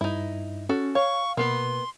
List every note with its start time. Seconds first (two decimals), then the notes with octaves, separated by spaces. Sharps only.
0.01 G2 D#4 E4
0.69 C#4 F#4 A4
0.95 C#5 F5 C#6
1.37 B2 A#3 B3 B4 C6